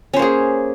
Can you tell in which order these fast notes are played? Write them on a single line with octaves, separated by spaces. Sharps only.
C#4 C5 A#3 G#4